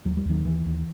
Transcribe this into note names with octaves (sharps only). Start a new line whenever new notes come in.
D#2 F#3
G3
D#2 D#3 F#3
D#2 E3
D#2